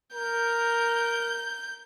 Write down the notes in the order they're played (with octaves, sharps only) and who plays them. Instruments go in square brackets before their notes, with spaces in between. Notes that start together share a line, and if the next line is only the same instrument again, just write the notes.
[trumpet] A#4 [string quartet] G6